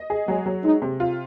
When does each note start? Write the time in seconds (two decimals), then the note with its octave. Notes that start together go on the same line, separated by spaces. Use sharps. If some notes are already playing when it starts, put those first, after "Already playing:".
Already playing: D#5
0.10 G#4
0.28 F#3 G#3
0.46 F#3
0.64 G#3 D#4
0.82 C3
1.00 F4